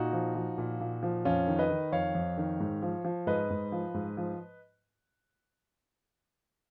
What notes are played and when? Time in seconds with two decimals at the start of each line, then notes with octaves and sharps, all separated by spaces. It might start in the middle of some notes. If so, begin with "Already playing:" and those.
Already playing: A#2 D#4 F#4
0.13 F3
0.35 F3
0.58 A#2
0.80 A#2
1.03 F3
1.25 F2 C#4 F4
1.48 D#3
1.59 B4 D#5
1.70 D#3
1.92 F2 C#5 F5
2.15 F2
2.38 D#3
2.60 G#2
2.83 F3
3.05 F3
3.27 G#2 B4 D#5
3.50 G#2
3.72 F3
3.94 G#2
4.17 F3